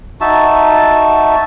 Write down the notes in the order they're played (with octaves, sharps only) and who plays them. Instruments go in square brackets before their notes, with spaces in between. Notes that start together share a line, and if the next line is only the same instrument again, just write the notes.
[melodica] D#4 F#4 E5 A5